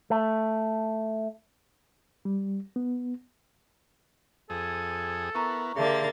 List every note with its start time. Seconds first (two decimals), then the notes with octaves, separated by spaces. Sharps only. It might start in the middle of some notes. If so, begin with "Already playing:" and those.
0.10 A3
2.25 G3
2.76 B3
4.50 F2 G#4 A4 D#6
5.35 B3 E4 A#4 A#5 C#6
5.76 D3 A#3 G4 G#4 E5 A5 C6 A6